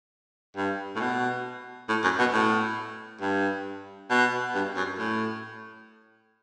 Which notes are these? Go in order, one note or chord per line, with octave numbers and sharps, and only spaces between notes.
G2
A2
B2
A2
F#2
B2
A2
G2
B2
G2
F#2
A2